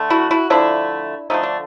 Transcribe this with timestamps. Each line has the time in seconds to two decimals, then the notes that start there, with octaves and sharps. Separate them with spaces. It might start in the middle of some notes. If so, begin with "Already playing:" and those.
Already playing: D3 A3
0.10 E4 F#4
0.31 E4 F#4
0.50 D3 F3 A3 D4 E4
1.30 D3 F3 A3 D#4
1.43 D4